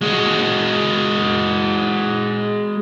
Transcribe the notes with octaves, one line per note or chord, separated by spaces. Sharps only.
G#3 F#4